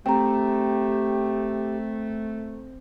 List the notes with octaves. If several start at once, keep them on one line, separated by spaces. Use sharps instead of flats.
A3 C4 G4 G5 A#5